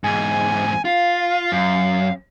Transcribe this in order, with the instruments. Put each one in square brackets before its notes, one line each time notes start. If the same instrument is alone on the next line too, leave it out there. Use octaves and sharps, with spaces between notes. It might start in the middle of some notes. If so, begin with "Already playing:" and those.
[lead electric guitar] E2 G#2 [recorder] G#5
[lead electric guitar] F4 [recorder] F5
[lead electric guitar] F#2